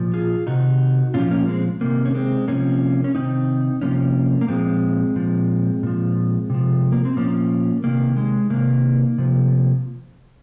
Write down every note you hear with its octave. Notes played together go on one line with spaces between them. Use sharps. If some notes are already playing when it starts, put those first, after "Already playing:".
Already playing: A#2 F3
F4 G#4
C3 D#3 D#4 F#4
A#2 F3 C#4 F4
A#3 C#4
G#3 C4
C3 D#3 A#3
C#4
G#3 C4
C3 F3 A#3 C#4
C#4
C3 D#3 C4 D#4
C3 F3 A#3 C#4
A#3
A#2 F3 G#3 C4
A#2 F3
A#2 F3
C3 F3
A#3
C4
A#2 F3 A#3 C#4
C3 D#3 A#3
G#3
C3 D#3 A#3
C3 F3